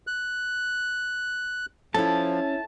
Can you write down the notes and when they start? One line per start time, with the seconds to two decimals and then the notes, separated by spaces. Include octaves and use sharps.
0.07 F#6
1.94 F3 C#4 E4 A4 A5